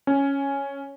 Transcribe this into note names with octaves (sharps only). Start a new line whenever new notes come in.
C#4